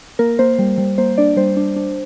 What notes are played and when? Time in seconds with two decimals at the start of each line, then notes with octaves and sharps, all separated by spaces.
0.19 A#3 A#4
0.39 A#3 C5
0.59 G3
0.78 G3
0.98 A#3 C5
1.18 D4 D5
1.37 G3 C5
1.57 D4
1.76 D4